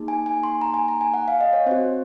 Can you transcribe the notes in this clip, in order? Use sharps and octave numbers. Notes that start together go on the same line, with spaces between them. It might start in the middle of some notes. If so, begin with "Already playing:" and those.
Already playing: A#3 D#4 G#4
G#5
G#5
C6
A#5
G#5
A#5
G#5
F#5
F5
D#5
C#5
C4 F#4 C5